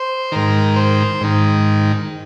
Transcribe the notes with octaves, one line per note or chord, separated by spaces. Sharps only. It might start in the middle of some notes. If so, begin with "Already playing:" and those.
Already playing: C5
G#2 D#3 A#4
C5
G#2 D#3